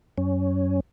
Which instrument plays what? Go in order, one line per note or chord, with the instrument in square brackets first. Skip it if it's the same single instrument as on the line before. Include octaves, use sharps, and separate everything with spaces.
[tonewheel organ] F#2 C#4